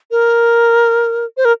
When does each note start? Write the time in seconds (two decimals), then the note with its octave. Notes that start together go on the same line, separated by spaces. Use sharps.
0.11 A#4
1.37 C5
1.45 A#4